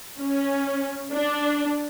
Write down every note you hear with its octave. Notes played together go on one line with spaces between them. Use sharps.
C#4
D4